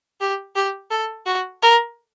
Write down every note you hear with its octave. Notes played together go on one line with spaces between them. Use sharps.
G4
G4
A4
F#4
A#4